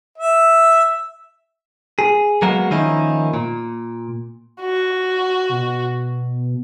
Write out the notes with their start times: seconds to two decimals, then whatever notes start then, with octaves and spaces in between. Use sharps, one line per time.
0.18 E5
1.99 G#4
2.42 F#3 G#3 A#3 B3 F#4 A#4
2.71 D#3 F3 A#3 C#4 D#4 E4
3.34 A#2
4.61 F#4
5.49 B2